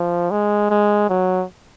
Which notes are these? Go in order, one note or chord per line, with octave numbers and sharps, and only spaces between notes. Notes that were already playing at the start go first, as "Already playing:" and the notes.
Already playing: F3
G#3
G#3
F#3